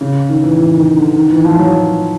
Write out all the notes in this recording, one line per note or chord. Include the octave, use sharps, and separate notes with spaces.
C#3
D#3
E3
E3
D#3
D3
D#3
E3
F3
F#3